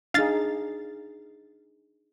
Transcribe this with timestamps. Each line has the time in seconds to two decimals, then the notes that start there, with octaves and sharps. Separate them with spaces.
0.14 D4 D#4 G#4 F5 A6